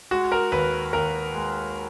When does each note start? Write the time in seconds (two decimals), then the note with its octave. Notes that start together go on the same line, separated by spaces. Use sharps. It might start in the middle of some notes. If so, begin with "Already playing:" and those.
0.11 G#3 F#4
0.32 A#4
0.52 D#2 B4
0.93 D#2 A#4
1.35 G#3